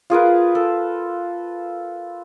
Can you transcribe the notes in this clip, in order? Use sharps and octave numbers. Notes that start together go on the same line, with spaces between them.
F4 G#4 A#4 B4
A4